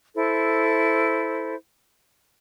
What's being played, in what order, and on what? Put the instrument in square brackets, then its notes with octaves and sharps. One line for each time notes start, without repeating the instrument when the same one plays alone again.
[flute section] E4 A4 C5